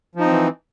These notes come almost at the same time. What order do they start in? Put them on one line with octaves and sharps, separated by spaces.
F3 D#4 C4 E3